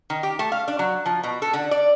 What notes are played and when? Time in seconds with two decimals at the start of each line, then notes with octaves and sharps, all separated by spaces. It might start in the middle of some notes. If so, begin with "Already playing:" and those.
0.10 D#3
0.23 G4
0.39 A3
0.52 F5
0.68 D4
0.79 F#3
1.06 F3
1.23 B2
1.42 A4
1.53 D3
1.71 D5